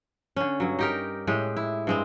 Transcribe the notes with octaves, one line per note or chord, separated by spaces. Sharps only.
D3 C#4
G2 F#3
D#4 G4 A#4
A2 G#3 G4
E4
G2 G#3 C4